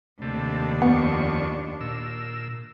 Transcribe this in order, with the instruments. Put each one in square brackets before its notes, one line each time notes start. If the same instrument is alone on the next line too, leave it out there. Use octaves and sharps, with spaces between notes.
[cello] D#2 D4 [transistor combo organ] C3 A3
[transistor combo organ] F2 C#6 [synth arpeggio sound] B3
[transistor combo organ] A#2 E6